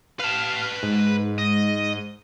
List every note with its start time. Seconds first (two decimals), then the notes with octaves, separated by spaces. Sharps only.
0.20 B4 F5 A5
0.83 G#2
1.38 D#5